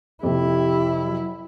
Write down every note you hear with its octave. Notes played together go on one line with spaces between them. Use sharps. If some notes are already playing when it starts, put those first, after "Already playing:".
F2 C3 E4 G4
F#3